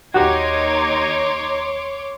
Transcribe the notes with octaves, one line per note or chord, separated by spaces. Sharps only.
D#2 D#4 F#4 G4 C#5 C6 D6 G#6